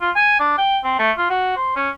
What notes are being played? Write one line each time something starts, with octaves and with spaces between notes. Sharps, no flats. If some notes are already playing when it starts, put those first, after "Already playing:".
F4
G#5
D4
G5
C4
A3
F4
F#4
C5
C#4